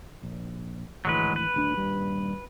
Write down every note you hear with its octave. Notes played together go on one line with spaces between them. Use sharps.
A#1
G#1 D2 E3 F#3 G#3 B4
B4
D#1 D2 D4
D#1 G2 G3